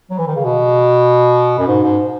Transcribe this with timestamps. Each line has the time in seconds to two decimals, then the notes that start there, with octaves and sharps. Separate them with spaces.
0.10 F#3
0.18 E3
0.28 D#3
0.36 C#3
0.44 B2
1.59 F#2
1.67 G#2
1.83 G#2